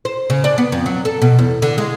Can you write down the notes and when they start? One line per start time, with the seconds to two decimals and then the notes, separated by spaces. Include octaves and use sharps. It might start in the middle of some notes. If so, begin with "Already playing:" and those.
0.05 C5
0.30 C#3
0.44 D4
0.58 B3
0.72 F2
0.86 F#3
1.05 A4
1.22 B2
1.39 E2
1.62 D3
1.78 G#3